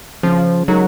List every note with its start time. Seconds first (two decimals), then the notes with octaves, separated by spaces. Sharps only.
0.23 C#3 F3
0.68 F#3 G#3 D#4 A#4